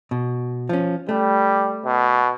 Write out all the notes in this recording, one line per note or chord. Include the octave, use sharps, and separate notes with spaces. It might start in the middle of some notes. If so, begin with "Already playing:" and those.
B2
F3 C#4
G3 A3
B2